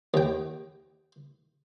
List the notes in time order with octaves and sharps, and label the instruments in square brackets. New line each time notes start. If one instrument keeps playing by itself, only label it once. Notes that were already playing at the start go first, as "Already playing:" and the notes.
[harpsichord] D#2 G5